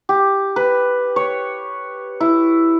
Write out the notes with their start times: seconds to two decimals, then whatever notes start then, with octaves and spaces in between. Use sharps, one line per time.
0.09 G4
0.56 B4
1.16 C#5
2.20 E4